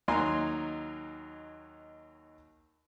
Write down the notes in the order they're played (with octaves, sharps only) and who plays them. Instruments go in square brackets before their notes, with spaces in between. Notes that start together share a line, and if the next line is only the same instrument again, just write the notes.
[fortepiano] D#2 F#3 D#4 G#5 A#5 C6